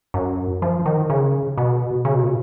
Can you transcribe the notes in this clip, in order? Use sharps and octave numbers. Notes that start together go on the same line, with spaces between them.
F#2
F3
D#3
C#3
B2
C#3
B2
A#2